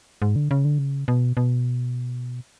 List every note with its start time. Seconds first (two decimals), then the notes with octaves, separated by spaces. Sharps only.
0.22 G#2
0.36 D3
0.51 C#3
0.65 D3
0.79 C#3
1.08 B2
1.37 B2